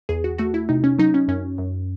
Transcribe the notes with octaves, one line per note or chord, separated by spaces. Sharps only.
E2 G#4
F#4
A3 F#4
E4
C3 D#4
C#4
F#3 D#4
C#4
F#2 C#4
F#2